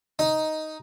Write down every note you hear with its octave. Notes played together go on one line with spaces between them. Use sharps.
D#4